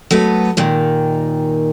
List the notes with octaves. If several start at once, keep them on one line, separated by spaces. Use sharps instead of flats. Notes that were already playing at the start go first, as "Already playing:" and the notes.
F#3 A3 B3 B4
D#2 A#2 D#3